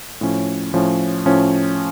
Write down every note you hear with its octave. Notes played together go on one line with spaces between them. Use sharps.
A2 F3 C#4
A2 F3 C#4
A2 F3 C#4